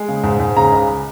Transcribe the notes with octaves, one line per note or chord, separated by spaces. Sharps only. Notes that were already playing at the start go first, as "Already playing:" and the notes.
Already playing: G#3
C#3
G#2
G#2
C#3 A#5
C#2